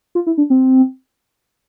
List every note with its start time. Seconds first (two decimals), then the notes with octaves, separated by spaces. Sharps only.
0.15 F4
0.27 E4
0.38 D4
0.50 C4